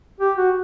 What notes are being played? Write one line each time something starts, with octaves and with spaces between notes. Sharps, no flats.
G4
F#4